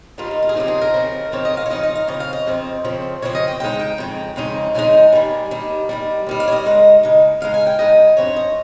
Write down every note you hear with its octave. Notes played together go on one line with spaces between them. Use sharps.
D#2 D#3 G3 A#3 F4
D#4
F4
G#4
C#3 F3 C4 D#4 G4
G#4
A#4
C#3 F3 C4 D#4
C#3 F3 C4 D#4 C#5
D#5
F5
C#5
C#3 F3 C4 D#4 D#5
D#5
F5
F2 C#3 F3 C4 D#5
F5
D#5
F2 C#3 F3 C4
F2 C#3 F3 C4
F2 C#3 F3 C4 C#5
D#5
G5
F2 C#3 G#3 D#4 G5
G5
F2 C#3 G#3 D#4
F2 C#3 G#3 D#4
F2 C#3 G#3 D#4 G#5
D#2 D#3 G3
D#2 D#3 G3
D#2 D#3 G3
D#2 D#3 G3
F5
C#5
D#5
C#3 G#3 D#4
C#3 G#3 D#4
C#3 G#3 D#4 F5
G#5
G5
C#3 G#3 D#4 D#5
G2 F3 C4 D#4 C#5
D#5